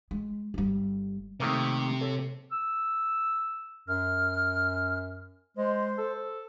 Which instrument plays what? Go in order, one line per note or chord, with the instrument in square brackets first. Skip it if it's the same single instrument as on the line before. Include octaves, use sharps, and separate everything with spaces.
[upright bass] G#3
G1 G3
[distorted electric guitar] C3 [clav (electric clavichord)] D#3 A3 A#3
[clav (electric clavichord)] A4 C#5
[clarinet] E6
[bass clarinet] F#2 [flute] F6
[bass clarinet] G#3 [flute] C5
[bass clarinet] A4